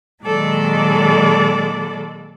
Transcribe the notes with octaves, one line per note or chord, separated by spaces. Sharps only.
A#2 D#3 F#3 G#3 A4 D5